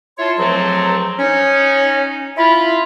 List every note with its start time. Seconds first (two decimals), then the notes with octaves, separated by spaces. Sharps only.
0.19 E4 F4 C#5 A5 C6
0.38 C#2 F3 F#3 A3 C4 A#5
1.19 C#4 D#4
2.37 E4 F4 B5